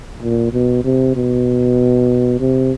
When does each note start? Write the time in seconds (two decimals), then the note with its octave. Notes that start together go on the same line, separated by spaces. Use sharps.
0.22 A#2
0.53 B2
0.84 C3
1.16 B2
2.40 C3